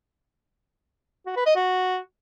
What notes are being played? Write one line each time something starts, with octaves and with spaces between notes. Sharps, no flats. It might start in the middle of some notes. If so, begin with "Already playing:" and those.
F#4
B4
D#5
F#4